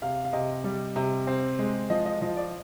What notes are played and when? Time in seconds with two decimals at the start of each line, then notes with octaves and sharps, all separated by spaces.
0.02 C3 F5
0.25 F5
0.33 C3 D#5
0.64 G3
0.96 C3
1.27 C4
1.59 G#3
1.90 F3 D#5
2.06 D#5
2.21 F3 D#5
2.37 D5